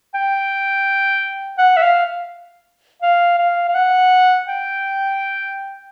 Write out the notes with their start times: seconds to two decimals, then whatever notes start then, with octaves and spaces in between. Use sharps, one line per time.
0.15 G5
1.59 F#5
1.77 E5
1.83 F5
3.02 F5
3.38 F5
3.69 F5
3.75 F#5
4.47 G5